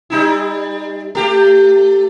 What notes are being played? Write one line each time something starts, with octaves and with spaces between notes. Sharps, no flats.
G3 D#4 E4
A3 G4